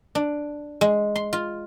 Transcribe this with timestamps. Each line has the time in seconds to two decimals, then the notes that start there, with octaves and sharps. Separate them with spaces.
0.15 D4
0.81 G#3
1.16 C6
1.33 F4